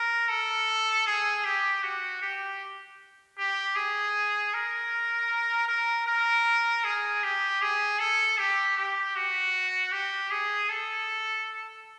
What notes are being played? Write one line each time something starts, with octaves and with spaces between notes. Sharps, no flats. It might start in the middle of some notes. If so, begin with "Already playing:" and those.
Already playing: A#4
A4
G#4
G4
F#4
G4
G4
G#4
A#4
A#4
A#4
G#4
G4
G#4
A4
G4
G4
F#4
G4
G#4
A4